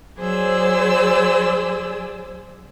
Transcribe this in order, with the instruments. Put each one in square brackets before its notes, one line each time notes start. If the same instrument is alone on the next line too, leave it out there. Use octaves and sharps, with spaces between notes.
[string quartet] F#3 G#4 C5 D5 E6